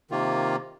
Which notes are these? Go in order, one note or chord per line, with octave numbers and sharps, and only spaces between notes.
C3 D#3 A#3 F4